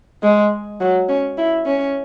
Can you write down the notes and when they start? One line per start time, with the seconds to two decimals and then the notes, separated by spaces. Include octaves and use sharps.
0.23 G#3
0.80 F#3
1.09 C#4
1.37 E4
1.66 C#4